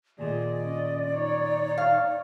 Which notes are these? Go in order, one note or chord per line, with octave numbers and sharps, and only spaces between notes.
D#2 A#2 G#4 D5 D#5
C#4 D#5
D#4 C#5
F5